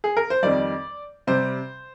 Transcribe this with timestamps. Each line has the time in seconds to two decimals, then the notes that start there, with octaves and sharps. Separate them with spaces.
0.04 G#4
0.17 A#4
0.30 C5
0.43 F2 D#3 G3 D5
1.27 C3 G3 C5